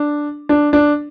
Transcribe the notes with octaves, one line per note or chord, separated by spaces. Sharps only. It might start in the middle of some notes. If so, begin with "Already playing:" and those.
Already playing: D4
D4
D4